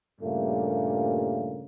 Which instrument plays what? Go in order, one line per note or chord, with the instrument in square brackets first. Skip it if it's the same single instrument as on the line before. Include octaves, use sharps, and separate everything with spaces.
[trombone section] G2 A#2 C#3 G3 A3 A#3